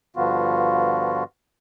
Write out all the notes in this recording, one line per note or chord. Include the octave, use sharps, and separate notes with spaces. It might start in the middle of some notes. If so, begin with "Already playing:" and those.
G2 D3 F3 B3 F4 F#4